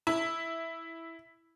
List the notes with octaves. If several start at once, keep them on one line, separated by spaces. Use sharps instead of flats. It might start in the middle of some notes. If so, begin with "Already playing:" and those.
E4